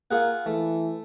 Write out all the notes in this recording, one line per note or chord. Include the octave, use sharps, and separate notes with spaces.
A#3 F4 G#4 F#5
E3 A3